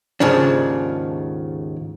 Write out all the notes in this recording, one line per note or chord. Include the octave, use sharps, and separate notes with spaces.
D#2 G#2 C#3 F3 D4